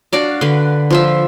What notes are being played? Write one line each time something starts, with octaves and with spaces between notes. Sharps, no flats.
D4 F#4 D5 F5
D3 B4
F3 F4 E5